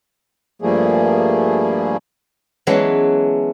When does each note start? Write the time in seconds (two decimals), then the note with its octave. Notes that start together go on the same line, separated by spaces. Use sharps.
0.62 G2 F3 G3 A3 A#3 G#4
2.67 E3 F#3 G#3 B3 C#4 D4